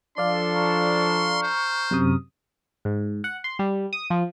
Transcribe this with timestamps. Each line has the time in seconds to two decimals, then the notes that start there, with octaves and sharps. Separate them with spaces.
0.18 F3 D4 A4 D5 F5 C6
0.54 A#5 C#6 F6
1.43 C5
1.91 F#2 C3 D#6
2.85 G#2
3.24 F#5
3.44 C6
3.59 G3
3.93 D#6
4.10 F3